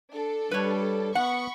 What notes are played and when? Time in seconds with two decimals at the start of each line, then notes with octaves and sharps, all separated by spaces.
0.12 D4 A4
0.51 G3 B4 C#5
1.15 B3 F#5 B5 C#6